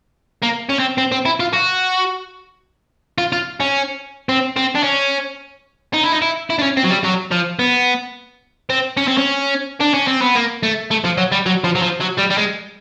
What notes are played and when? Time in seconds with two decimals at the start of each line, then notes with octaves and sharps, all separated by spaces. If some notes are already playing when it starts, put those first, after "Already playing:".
0.43 A#3
0.70 C#4
0.80 C4
0.98 C4
1.12 C4
1.26 E4
1.40 F4
1.53 F#4
3.18 F4
3.32 F4
3.60 C#4
4.29 C4
4.57 C4
4.75 D4
4.84 C#4
5.94 D#4
6.04 E4
6.12 D#4
6.22 E4
6.50 E4
6.59 D4
6.63 C#4
6.77 C4
6.84 F#3
6.91 G3
7.05 F#3
7.32 F3
7.59 B3
8.70 C4
8.97 C#4
9.08 C4
9.18 C#4
9.80 D4
9.94 C#4
10.08 C4
10.22 B3
10.35 A#3
10.63 A3
10.91 A3
11.05 F3
11.18 F#3
11.32 G3
11.46 F#3
11.64 F3
11.75 F#3
11.82 F3
12.01 F#3
12.19 G3
12.31 G3
12.38 G#3